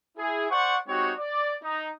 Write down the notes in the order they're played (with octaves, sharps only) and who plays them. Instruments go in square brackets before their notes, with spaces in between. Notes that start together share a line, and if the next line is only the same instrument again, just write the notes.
[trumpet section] E4 G#4
C5 D5 F#5 C#6
G#3 C4 D#4 F#4 G4 C#5
D5
D#4